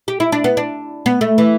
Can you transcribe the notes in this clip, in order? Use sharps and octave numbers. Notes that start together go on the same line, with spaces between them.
G4
E4
D4
B3
D4
B3
A3
E3